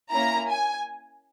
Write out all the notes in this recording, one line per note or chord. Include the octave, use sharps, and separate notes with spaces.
A#3 C#4 E4 A#5
G#5